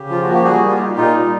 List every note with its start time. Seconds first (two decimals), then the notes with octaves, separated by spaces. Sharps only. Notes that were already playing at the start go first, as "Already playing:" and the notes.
Already playing: C#3 G4
0.09 F3 F4
0.23 A#3 F#4
0.33 G4
0.43 G3 F#4 G#4
0.61 A#3
0.70 F4 G4
0.80 D#4
0.97 A#2 D#4 F4
1.15 G3